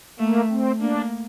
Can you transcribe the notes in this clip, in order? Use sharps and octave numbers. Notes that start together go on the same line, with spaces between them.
A3 A#3
C4
A#3 D4